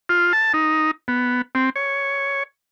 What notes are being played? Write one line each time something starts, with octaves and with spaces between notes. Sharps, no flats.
F4
A5
D#4
B3
C4
C#5